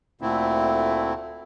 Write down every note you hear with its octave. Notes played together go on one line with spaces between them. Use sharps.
D2 A#2 D3 A3 C4 E4